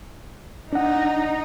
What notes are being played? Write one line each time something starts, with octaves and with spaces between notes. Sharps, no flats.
D4 D#4 F#5